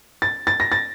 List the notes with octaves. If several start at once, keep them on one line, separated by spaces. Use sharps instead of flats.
A6
A6
A#6
A6